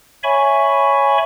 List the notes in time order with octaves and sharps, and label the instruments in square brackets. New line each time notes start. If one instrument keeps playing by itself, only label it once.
[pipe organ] C#5 E5 G#5 B5 C#6